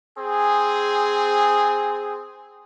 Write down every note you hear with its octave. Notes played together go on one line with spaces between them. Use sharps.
C4 G#4